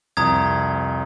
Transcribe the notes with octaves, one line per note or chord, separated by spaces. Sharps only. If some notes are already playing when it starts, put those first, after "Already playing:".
C2 F2 A#5 D#6 G#6